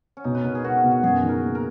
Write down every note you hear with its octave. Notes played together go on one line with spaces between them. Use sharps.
C#4
B2 D#4
B4
B2 A#4
G#4
B3 F#4
B2
F#4
F#2 G#4
D#3
A#4
A#3
A#4